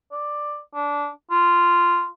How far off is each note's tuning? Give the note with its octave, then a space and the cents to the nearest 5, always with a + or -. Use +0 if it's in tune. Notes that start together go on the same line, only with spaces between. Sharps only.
D5 +10
D4 -20
F4 -10